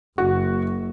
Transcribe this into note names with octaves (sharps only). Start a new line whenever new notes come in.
F#1 F#4